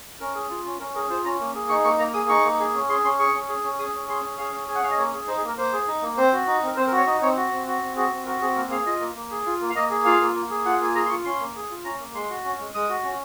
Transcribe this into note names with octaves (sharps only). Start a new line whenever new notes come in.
C#4 A#4
G#4
F4
C#4
C#4 A#4
G#4 A#4
F4 C5
C#4 A#5
A#3
G#4
D#4 C#6
A#3 C#6
A#3 A#5
G#4 D#6
D#4 C#6
A#3
G#4
C#4
G#4 C6
C#4 C6
G#4 C#6
C#4
G#4
C#4
G#4 D#6
C#4
G#4 C6
C#4
G#4 F5
C#4
G#4 G#5
F#5
C#4 F5
D#5
A#3 C#5
G#4
D#4 C5
G#4
A#3 A#4
A#3 C5
G#4
D#4
A#3
C4 C5
F#4
D#4
C4 A#4
C4 C5
A#4
F#4
C#5
D#4 D#5
C4 C#5
F#4
C4
F#4
C4
F#4 G#4
C4
F#4 A#4
C4 G#4
A#3 A#4
G#4 F5
F4 D#5
A#3
A#3
G#4
F4
A#3
F5
A#3 D#5
G#4
F4 F5
A#3
A#3
G#4
F4 F#5
A#3 G#5
G#4 A#5
C6
F4 C#6
C#4 C6
A#3
G#4
F4
C#4 A#5
A#3
G#3 C6
F#4
C#4
G#3
G#3 D#6
F#4
C#4